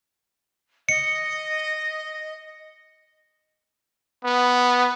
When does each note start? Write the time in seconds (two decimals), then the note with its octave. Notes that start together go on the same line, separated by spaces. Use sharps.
0.89 D#5 C#7
4.24 B3